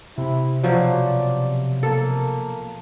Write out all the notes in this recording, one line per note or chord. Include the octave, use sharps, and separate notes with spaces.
C3 E4
B2 F3 F#3 D5
A#3 A4